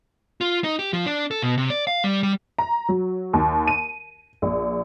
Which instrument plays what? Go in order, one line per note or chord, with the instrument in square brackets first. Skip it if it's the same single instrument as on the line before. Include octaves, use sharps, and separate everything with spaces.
[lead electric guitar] F4
D#4
G4
F3
D4
A4
B2
C3
D5
F5
G3
G3
[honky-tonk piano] A#5
F#3
D#2
D#7
A#1